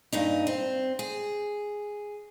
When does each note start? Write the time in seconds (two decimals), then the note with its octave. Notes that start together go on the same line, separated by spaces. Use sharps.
0.13 G2 A#2 D#4
0.47 C4
0.99 G#4